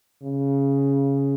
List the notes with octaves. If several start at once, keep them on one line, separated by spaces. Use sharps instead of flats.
C#3